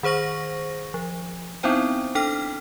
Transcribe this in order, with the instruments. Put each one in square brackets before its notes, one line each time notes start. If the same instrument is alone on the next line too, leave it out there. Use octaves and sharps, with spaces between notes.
[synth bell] D#3 G#4 C5 C#6 A#6
F3
B3 C4 D#4 E4 C5 G5
D4 A4 G5 F6 B6